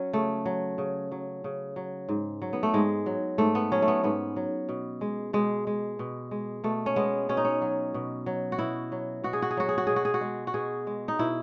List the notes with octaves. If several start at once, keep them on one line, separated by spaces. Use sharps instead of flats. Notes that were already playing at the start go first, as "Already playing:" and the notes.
Already playing: F#3 C#4
C#3 A3
F#3
C#3
F#3
C#3
F#3
G#2
F#3
B3
A3
G#2 G#3
F#3
G#2 A3
B3
F#3 C#4
A3
B3
G#2 B3
F#3
B2
G#3
B2 G#3
G#3
B2
G#3
B2 A3
C#4
G#3 B3
B2 C#4
D#4
C#4
F#3
B2
F#3
F#4
B2 E4
F#3
B2 F#4
G#4
F#4
G#4
F#3 F#4
G#4
F#4
B2 G#4
F#4
G#4
F#4
G#3
F#4
B2 G#4
G#3
D#4
B2 E4